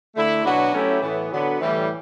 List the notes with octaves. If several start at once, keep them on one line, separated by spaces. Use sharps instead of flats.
D3 A3 E4
B2 F#3 B3 D4 F#4
F#3 A3 C#4 E4 G4
A2 E3 B3
D3 F#3 B3
A2 E3 G3